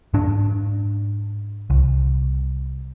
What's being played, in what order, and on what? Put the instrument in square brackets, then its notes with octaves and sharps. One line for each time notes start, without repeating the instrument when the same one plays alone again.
[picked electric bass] G#2 D4
C2